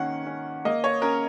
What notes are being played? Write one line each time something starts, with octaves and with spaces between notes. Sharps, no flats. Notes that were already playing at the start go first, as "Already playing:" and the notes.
Already playing: D#3 A#3 C#4 F#5
C#4
A#3 D#5
C#5
C#4 A#4